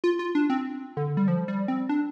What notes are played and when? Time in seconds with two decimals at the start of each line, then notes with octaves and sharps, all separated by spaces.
0.04 F4
0.19 F4
0.35 D4
0.50 C4
0.97 D3
1.17 G3
1.28 F3
1.48 G3
1.68 C4
1.89 D4